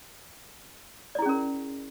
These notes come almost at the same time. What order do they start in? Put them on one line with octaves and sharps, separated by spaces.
D5 E4 G#4 C#4 A#4